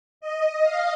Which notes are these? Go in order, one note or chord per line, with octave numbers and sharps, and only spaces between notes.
D#5
F5